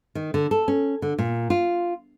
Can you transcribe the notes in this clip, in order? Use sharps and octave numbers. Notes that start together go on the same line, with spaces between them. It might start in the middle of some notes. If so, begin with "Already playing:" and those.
D#3
D3
A4
C#4
D3
A#2
F4